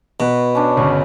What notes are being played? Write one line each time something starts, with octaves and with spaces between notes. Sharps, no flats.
B2 F#4 B4
C#4 D4
G1 C#3 C#5